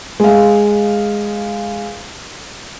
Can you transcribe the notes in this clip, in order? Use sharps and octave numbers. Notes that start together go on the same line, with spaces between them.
G#3 F5